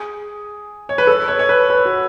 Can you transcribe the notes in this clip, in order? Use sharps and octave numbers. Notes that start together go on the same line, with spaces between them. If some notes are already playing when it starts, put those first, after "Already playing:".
Already playing: G#4
C#5
B4
A4
C#5
C#5
B4
B4
F#4